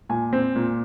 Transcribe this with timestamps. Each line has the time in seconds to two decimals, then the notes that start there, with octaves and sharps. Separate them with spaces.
0.09 A#2 G#5
0.33 C4
0.56 A#2